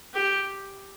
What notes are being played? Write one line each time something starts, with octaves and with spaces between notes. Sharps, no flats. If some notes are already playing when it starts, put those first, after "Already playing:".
G4